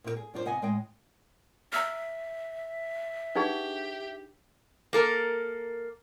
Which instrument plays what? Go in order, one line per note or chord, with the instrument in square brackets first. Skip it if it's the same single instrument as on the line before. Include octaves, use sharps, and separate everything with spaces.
[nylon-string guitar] A#2 E4 A#4
G#4
F#2 D4 F4 A#4 C5
C3 B3 D#5 F#5 G#5
A2 G#3 D#5 G5 G#5
[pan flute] E5 [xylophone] A#5 E6 F6
[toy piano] D4 D#4 G#4 [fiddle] G4 [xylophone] B4 F#5 G#6
[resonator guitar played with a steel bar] A#3 A4 A#4